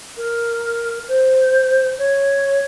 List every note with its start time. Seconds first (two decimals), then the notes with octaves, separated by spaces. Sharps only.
0.17 A#4
1.08 C5
1.98 C#5